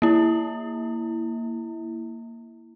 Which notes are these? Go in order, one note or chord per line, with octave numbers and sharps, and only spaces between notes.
A#3 E4